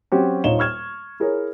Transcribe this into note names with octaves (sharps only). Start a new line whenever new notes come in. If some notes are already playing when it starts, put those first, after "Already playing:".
F#3 C4 C#4 F#4 G4
D#1 D#4 F4 C#5 E7 G7
C#6 F6 G#6 E7
E4 G#4 A#4 C#5